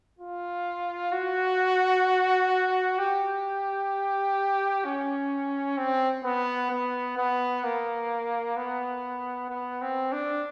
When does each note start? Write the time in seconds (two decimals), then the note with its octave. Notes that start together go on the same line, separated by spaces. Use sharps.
0.19 F4
1.12 F#4
2.98 G4
4.85 C#4
5.78 C4
6.24 B3
6.71 B3
7.18 B3
7.64 A#3
8.57 B3
9.50 B3
9.81 C4
10.12 D4